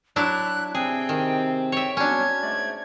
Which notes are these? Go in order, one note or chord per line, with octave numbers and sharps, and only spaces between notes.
F#3 D4 E4 F#6
C3 C4 G#4 G5
D#3
C#5 E5 G5
F#3 G3 B3 C#4 D4 G#6
G#2 A3 D5